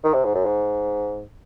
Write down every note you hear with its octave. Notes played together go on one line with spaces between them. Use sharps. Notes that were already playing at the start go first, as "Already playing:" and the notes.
D#3
C3
G#2
F#2
G#2